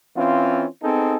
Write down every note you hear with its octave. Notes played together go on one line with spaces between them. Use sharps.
E3 C4 C#4 F4
B3 C4 D#4 G#4 A4